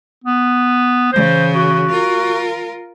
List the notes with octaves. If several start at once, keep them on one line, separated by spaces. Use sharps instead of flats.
B3
C#3 E3 C5
F#4
F4 A#4